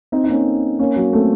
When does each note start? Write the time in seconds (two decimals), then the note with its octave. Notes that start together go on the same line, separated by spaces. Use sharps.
0.12 C4 D#4
0.24 D#4
0.30 A#3 C#4
0.79 A#3 C#4
0.96 F#3 A#3
1.13 A3 C4